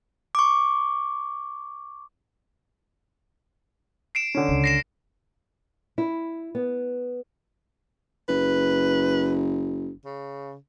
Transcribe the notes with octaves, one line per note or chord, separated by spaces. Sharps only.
C#6 D6
C7 D7 E7
D3 C#4
C#2 C#3
A#6 C7 E7
E4
B3
F#1 B4
C#3